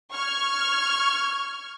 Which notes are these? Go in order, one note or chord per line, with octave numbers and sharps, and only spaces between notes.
C#6 F6 G#6